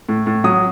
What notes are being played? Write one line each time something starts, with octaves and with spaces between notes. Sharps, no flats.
A2
A2
F#3 D#6